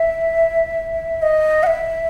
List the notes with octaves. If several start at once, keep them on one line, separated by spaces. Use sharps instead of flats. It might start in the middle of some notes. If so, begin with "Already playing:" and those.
Already playing: E5
D#5
F#5
E5